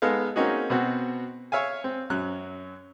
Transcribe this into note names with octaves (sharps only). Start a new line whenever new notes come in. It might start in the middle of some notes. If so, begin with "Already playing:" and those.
G#3 B3 D#4 A4 F5
A#3 C4 C#4 D#4 F#4 G#4
B2 C4 F#4
C#5 E5 F5 G#5
C4
F#2 F#3 F#6